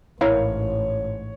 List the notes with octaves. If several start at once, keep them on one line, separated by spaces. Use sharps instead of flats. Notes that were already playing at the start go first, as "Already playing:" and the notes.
A1 G#2 E4 A#4 C#5 F5